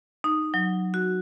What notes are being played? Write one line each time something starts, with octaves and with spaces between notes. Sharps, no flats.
D#4
F#3
F#4